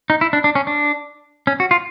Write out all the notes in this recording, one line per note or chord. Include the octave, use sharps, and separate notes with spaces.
D#4
E4
D4
D4
C#4
D4
C#4
F#4
F4